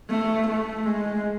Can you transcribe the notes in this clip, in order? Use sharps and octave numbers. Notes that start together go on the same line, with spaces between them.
A3
A3
G#3